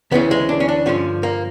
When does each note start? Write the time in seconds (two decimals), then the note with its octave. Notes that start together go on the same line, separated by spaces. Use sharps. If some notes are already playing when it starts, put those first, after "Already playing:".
0.11 D2 C#3 E3 B3
0.31 G#3
0.49 D4
0.60 C#4
0.68 D4
0.86 G2 D3 F3 C#4
1.23 A#3